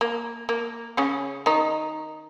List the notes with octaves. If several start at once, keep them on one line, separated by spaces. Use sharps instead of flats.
A#3
A#3
C#3 C#4
D#3 D#4